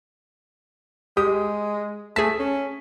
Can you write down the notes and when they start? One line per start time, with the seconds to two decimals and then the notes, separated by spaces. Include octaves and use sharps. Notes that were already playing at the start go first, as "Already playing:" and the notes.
1.17 G#3 G4 D#6
2.16 A3 G#4 A5 B6
2.39 C#4